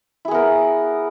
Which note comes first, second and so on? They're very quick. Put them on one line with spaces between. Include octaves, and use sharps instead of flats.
E4 G#4 B3 A#4